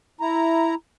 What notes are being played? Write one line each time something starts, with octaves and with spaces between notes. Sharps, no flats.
E4 A#5